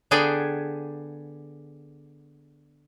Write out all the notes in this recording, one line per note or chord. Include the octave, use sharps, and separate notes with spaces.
D3 B3 G#4 D5 G5 G#5